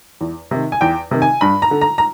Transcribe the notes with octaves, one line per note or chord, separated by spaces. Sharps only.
E2
C3 D#3
G#5
E2 G5
C3 D#3
G#5
G2 B5
A#5
D3
A#5
A#5